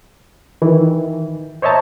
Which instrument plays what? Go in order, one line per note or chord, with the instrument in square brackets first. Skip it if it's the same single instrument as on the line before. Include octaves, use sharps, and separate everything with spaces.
[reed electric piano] D#3 E3
C5 C#5 D#5 E5 A5 A#5